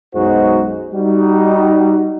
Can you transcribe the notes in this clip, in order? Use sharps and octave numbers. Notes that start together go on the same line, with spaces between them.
B1 F#2 G#3 D#4 F#4 C5
G3 D#4 F#4